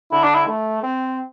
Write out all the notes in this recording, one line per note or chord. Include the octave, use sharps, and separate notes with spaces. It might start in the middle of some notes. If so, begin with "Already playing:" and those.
D3 E4
D4
E4
A3
C4